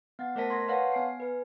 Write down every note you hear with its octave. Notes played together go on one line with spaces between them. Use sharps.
B3 F#5 A6
A3 A#4 C5 E5 A5 B6
C6 G#6 A#6
B4 C#5 F5 F#5 A5 C6
B3 G#5 C7
B4 G#5